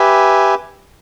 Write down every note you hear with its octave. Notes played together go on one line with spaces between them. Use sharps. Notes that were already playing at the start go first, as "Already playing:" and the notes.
Already playing: G4 B4 E5 G#5